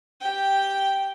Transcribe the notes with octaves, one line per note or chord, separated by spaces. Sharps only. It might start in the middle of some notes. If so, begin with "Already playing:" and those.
G4 G5